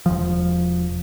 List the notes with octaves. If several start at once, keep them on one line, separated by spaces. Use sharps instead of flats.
E1 F3